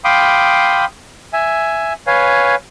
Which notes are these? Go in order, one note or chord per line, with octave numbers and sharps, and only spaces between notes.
F5 G5 B5 C6 D6 D#6
E5 G#5
B4 C#5 F5 G#5